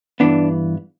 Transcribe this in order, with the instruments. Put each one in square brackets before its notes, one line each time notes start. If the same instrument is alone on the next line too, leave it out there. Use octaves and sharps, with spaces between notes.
[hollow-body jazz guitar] G2 E3 B3 D4